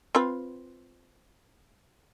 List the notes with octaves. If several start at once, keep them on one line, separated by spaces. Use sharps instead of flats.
C4 F4 B4